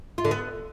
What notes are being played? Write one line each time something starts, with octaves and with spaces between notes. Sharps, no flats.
F4
D3
B3